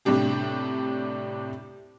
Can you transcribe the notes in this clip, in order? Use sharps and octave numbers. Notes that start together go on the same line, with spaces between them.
A2 C3 G3 D4 G4